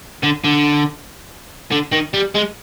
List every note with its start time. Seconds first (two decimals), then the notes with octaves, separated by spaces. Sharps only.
0.23 D3
0.44 D3
1.71 D3
1.92 D#3
2.13 G3
2.35 G#3